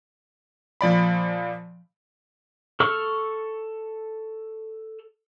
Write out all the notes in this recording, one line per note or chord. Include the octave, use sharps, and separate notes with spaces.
A#2 F3 D5 B5
A4 C#6 E6 F6